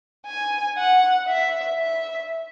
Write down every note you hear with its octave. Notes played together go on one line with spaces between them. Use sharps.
G#5
F#5
E5
E5